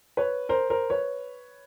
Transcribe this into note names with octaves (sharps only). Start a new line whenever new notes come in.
B4 C#5
A#4 C5
A#4 C5
B4 C#5